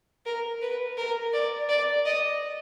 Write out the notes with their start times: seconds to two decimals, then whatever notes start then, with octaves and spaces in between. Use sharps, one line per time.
0.26 A#4
0.62 B4
0.97 A#4
1.33 D5
1.69 D5
2.05 D#5